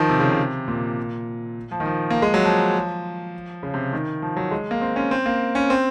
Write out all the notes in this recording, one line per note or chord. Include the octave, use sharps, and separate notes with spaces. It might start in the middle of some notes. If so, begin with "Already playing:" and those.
Already playing: D#3 F3
C3
C#3
C3
A#2
F3
D#3
F3
A#3
G#3
F#3
F3
C#3
C3
D#3
F3
F#3
G#3
A#3
C4
C#4
C4
A#3
C#4
C4